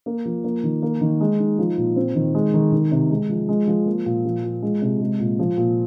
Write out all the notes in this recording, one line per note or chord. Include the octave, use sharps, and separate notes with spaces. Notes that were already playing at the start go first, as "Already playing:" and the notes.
A#3
F3
A#3
D#3
A#3
D#3
G#3
D#4
F3
A#2
C4
D#3
G#3
D#3
D#3
C3
G#3
F3
G#3
F3
A#3
A#2
F3
F4
G#3
C3
G#3
A#2
F3
A#2